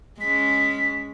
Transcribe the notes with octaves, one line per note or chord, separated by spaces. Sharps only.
G#3 C#4 B6